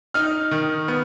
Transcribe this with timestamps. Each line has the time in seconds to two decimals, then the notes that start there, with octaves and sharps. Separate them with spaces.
0.14 D#4 F6
0.51 D#3
0.88 B3